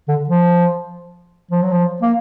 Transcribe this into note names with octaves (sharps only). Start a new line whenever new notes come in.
D3
F3
F3
F#3
F3
A#3